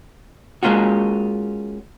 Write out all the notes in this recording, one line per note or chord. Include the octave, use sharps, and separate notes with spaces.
G#3 A#3 C#4 F4 F#4